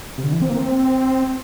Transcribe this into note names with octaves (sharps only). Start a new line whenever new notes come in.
C3
D3
E3
C4
A#3
C4